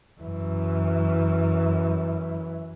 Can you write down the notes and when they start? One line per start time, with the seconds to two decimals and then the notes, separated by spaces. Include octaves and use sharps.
0.20 F#2 E3